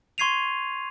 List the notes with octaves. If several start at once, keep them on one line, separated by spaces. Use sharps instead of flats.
C6 C#6 G#6 C7 D#7 F7